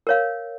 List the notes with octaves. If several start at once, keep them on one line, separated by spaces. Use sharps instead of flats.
A#4 C#5 F5